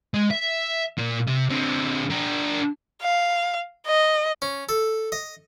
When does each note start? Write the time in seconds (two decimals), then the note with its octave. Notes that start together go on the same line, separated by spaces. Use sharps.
0.14 G#3
0.31 E5
0.97 A#2 A#3
1.27 C3
1.50 D3 C4
2.10 D4 A#4
3.02 F5
3.87 D#5
4.42 C#4
4.69 A4
5.12 D#5